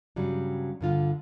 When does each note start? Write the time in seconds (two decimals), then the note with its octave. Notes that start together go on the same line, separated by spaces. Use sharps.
0.16 G2 C#3 F#3 G3
0.81 G2 D3 F4